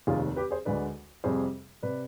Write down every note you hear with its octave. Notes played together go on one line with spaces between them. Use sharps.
F1 D#2 D#3 F4 G#4
G4 B4
G#4 C5
D2 D3 G#3 B4 D5
F2 C3 G3 G#4 C5
C3 B4 D5